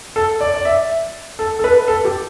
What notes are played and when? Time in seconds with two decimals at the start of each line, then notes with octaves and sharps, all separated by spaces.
0.16 A4
0.41 D5
0.54 D5
0.65 E5
1.39 A4
1.59 A4
1.64 B4
1.88 A4
2.05 G4